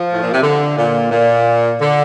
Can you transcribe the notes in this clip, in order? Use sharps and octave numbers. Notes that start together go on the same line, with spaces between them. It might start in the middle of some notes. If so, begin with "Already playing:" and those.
Already playing: F3
A2
A#2
C3
D3
A#2
A#2
D3